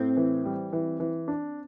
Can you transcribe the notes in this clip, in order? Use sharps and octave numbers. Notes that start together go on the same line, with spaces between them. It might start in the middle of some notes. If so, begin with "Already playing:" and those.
Already playing: A2 C4
E3
G3
E3
E3
D4